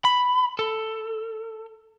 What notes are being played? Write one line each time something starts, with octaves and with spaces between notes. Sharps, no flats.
B5
A4